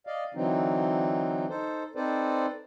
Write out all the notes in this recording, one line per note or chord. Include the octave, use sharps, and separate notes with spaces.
D5 D#5 F5
D3 E3 F#3 C4 D#4
D#4 A4 C5
C4 D#4 A4 B4 C5 D5